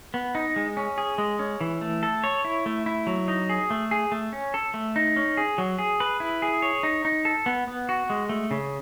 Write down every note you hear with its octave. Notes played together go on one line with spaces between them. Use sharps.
B3
D#4
G#3
C#4
G#4
G#3
C#4
E3
A3
A4
C#5
E4
A3
E4
F#3
D#4
G#4
A3
G#4
A3
C#4
A4
A3
D#4
C#4
G#4
F#3
G#4
B4
E4
G#4
C#5
D#4
D#4
A4
B3
B3
F#4
G#3
A3
C#3